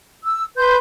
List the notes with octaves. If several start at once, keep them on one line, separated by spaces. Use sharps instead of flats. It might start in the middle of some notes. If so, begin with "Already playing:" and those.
E6
B4 C6 G6